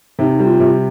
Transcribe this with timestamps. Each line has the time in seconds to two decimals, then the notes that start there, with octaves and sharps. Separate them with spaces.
0.19 C3 D#4
0.39 G3
0.46 F4
0.60 C3